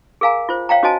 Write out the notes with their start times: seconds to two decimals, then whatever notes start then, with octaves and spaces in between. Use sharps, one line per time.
0.21 G#4 A#4 F5 G#5 A#5
0.49 F4 C5
0.69 C#5 F5 G5 A#5
0.83 C#4 F#4 C5 D#5 G#5 A5